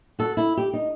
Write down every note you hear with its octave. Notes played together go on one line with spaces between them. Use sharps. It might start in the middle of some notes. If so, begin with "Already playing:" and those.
F#4 A4
E4
G4
D#4